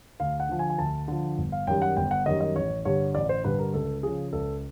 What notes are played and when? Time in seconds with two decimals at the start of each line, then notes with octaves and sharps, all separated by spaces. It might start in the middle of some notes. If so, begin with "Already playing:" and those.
0.20 D2 F5
0.40 F#5
0.49 D3 F3
0.59 G#5
0.70 G#5
0.79 D2 A5
1.08 D3 F3
1.38 G1
1.52 F5
1.67 F#2 D#3 G3 G5
1.82 F#5
1.97 G1 G5
2.11 F#5
2.26 F#2 D#3 G3 D#5
2.41 D#5
2.55 A1 C#5
2.85 G2 D3 G3 C#5
3.15 A1 D5
3.29 C5
3.44 G2 D3 G3 B4
3.59 A#4
3.74 C#2 A4
4.03 C#3 F3 G#4
4.33 C#2 A4